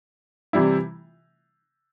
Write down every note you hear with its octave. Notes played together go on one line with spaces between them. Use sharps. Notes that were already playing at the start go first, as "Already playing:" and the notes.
C3 E3 G3 E4